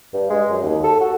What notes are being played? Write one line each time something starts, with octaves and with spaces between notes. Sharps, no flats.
G2
G#3
F#2
D#2
A4
F#4